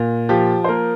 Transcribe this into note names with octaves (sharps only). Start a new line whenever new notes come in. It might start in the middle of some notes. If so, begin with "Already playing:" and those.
Already playing: A#2
F3 G4
C5
A#3 A#4